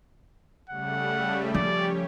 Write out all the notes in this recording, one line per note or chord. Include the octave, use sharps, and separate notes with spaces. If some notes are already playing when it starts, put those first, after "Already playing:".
C#3 G3 A3 F#5
F3 C#4 G4 C#5 D5